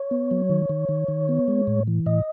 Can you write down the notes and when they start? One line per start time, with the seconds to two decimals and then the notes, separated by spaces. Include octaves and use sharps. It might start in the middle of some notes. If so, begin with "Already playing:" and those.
Already playing: C#5
0.11 B3
0.31 F#3
0.50 D#3
0.69 D#3
0.89 D#3
1.08 D#3
1.29 B3
1.48 G#3
1.67 A2
1.87 E3
2.06 A2 D#5